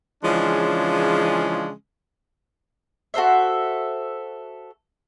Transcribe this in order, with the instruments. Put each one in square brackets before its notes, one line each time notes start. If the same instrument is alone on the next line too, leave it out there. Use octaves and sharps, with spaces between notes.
[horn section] C#3 E3 F3 G#3 C#4 D4
[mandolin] F#4 A4 C5 E5